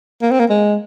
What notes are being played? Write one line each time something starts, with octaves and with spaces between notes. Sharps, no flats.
A#3
C4
A#3
G#3